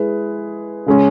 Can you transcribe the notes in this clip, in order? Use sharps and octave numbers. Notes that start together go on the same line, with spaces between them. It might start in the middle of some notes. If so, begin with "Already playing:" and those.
Already playing: G#3 E4 G#4 B4
C#3 G#3 C#4